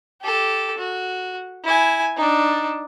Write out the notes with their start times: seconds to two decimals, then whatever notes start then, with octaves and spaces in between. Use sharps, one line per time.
0.21 G4 A4
0.78 F#4
1.64 E4 G#5
2.17 D4 D#4